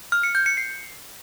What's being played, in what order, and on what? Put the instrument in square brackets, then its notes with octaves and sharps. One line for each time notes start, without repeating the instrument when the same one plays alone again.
[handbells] F6
C#7
G6
C#7
C7